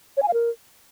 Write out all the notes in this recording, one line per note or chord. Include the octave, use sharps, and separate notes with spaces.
C#5
G#5
F5
A#4